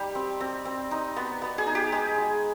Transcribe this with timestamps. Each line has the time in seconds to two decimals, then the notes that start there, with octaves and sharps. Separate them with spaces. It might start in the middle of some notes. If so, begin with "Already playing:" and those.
Already playing: G3 D#4 G4
0.15 C4
0.40 C4
0.65 C4
0.91 D#4
1.16 B3
1.42 B3
1.58 G#4
1.66 D#4
1.75 G4
1.92 G#3 G#4
2.18 G#3